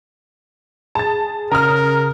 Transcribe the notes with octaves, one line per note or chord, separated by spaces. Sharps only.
G#4 A5 A6
C#3 A#4 A#5 D#6 F6